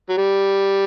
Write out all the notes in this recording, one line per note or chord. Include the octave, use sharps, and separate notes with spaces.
F#3
G3